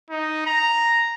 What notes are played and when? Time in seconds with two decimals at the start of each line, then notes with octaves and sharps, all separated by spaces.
0.10 D#4
0.47 A#5